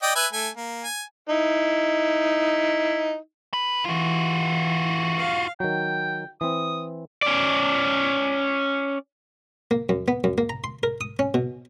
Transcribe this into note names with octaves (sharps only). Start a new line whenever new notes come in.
D5 D#5 G5
B4 E5 G#5
A3 G#5
A#3
G#5
D#4 E4
B4
E3 F4 F#4
F5
D#3 F#3 G5
E3 C4 D#6
C#4 D5
A#3
F#2
B3
F#2
A#3
A#5
C6
A#4
D#6
C#4
B2